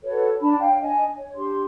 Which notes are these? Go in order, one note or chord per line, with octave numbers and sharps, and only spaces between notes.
F#4 A4 B4 C#5
D4 A5 B5
C#5 F5 G5
D4 D#5 G#5
C#5
D4 G4 C6